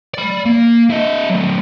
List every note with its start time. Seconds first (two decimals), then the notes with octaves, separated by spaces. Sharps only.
0.14 D5 B5
0.45 A#3
0.90 E4 D#5
1.30 F#3 A3